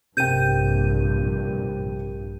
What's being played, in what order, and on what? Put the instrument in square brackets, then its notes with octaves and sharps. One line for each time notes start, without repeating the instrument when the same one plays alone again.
[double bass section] A#1 G2 [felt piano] C3 G5 [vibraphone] G4 A#4 [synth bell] G6 D#7